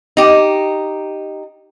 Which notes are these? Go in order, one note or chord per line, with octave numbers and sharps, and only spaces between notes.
D#4 G4